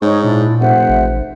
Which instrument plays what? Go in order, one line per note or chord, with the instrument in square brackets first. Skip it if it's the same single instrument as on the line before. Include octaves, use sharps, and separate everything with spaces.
[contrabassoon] G#2 [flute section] D#4 C#5 C#6
[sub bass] A#2 [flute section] D4 E4
[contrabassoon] F1 [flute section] C5 E5 F#5
[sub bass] A1